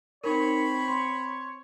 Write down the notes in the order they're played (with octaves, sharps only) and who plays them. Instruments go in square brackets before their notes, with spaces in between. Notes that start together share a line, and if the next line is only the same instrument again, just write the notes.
[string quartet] C4 B5 [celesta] D#4 A#4 [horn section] C#5
[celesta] C6